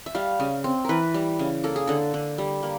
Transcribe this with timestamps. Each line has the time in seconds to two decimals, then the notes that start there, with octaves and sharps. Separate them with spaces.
0.06 E5
0.15 G3 F5
0.40 C#3
0.64 C4
0.85 E3 A#4 B4
1.14 G3
1.39 C#3
1.64 A#3 A4
1.76 G#4
1.87 D3 A4
2.14 D3
2.38 G3
2.63 A#3